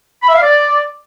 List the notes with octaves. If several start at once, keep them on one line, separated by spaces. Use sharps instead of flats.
B5
E5
F5
D5